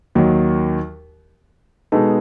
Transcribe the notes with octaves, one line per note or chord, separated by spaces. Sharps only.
D#2 D#3 F#3
B2 G#3 B3 D#4 A4